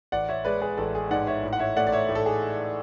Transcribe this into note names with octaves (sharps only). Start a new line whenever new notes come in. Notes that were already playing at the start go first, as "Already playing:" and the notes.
A1 D5 F#5
C#5 E5
G#3 B4 D5
G#4 B4
A1 A4
G#4
G#2 D5 F#5
C#5 E5
A2
F#5
C#5 E5
A3 D5 F#5
D5
C#5 E5
A2
A4
G#4